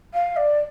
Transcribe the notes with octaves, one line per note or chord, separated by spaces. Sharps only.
F5
D5